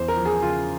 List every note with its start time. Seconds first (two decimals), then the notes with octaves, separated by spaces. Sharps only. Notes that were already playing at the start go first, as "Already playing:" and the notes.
Already playing: E2 C5
0.08 A#4
0.16 F3
0.25 G#4
0.42 C#3 F4